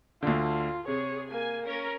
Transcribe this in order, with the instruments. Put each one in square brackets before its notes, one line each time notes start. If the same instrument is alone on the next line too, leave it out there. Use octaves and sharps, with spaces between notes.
[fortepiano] D2 D3 [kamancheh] F4
[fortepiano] C3 [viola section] G#4 [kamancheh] C#5
[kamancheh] A#3 [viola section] G#5
[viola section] C#4 A#4